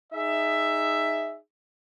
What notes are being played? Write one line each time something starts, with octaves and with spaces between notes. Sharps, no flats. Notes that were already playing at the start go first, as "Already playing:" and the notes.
D#4 G#4 E5